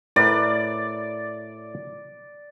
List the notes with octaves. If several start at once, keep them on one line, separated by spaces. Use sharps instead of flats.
A2 A#4 B4 D5